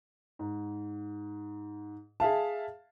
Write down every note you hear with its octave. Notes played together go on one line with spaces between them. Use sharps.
G#2
G#4 E5 F5 A5